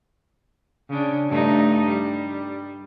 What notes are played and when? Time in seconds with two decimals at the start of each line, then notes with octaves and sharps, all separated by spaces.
0.90 C#3 D4
1.29 G2 A3 D#4
1.88 G3